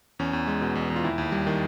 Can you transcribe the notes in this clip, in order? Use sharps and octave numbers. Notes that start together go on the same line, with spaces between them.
E2 C#4
E2
G#3
B2
E2
E2
F4
D#2 E4
D#2
G3
D#3